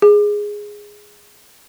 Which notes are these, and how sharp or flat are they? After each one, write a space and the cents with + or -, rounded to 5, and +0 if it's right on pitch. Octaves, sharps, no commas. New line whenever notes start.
G#4 -5